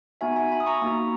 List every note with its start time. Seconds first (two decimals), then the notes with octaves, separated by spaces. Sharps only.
0.21 B3 D#4 F#4 E5 G#5
0.36 E5 G#5
0.52 G#5 B5
0.60 D#6
0.66 A#5 C#6
0.82 A#3 D#4 F#4